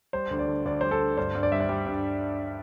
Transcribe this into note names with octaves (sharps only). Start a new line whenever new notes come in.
G3 C5
D2
D5
D3
D2 D5
G3 C5
A4
D2
G2 C5
G2
D5
G3 E5
D5
G3
G2